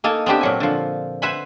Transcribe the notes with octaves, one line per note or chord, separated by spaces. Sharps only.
A#3 D#4 A4 G#5
B3 C4 D4 G4
A#2 F#3 G#5
D3 F3
B4 C5 E5 F#5 G#5 B5